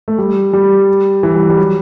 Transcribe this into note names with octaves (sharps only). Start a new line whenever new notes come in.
A3
G3
G3
E3
G3
G3
F#3